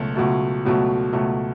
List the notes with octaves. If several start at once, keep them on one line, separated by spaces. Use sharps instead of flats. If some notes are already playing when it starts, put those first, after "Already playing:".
Already playing: C#2 B2 F#3 A3
C#2 B2 F#3 A3
C#2 B2 F#3 A3
C#2 B2 F#3 A3